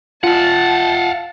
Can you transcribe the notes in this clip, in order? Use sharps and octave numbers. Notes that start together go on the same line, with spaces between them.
F4 F5 F#5 A5